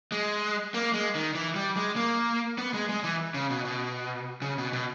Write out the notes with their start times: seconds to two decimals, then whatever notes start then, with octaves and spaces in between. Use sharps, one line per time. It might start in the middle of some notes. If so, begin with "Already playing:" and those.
0.12 G#3
0.74 A#3
0.94 G#3
1.15 D#3
1.35 E3
1.56 G3
1.76 G#3
1.96 A#3
2.58 B3
2.74 G#3
2.89 G#3
3.04 E3
3.34 C#3
3.50 B2
3.65 B2
4.42 C#3
4.58 B2
4.73 B2